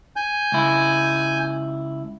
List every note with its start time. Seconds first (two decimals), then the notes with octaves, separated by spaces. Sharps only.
0.16 G#5 G6
0.52 C#2 E4